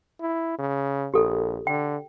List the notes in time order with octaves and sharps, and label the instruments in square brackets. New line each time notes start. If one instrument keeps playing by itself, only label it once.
[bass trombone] E4
C#3
[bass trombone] A#1 [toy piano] G4 A4
[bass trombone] D3 [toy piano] G5